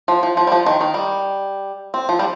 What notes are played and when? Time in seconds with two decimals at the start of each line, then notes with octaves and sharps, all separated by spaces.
0.08 F3
0.23 F3
0.37 F3
0.47 G3
0.52 F3
0.66 D#3
0.81 D#3
0.94 G3
1.94 C4
2.09 F3
2.19 G3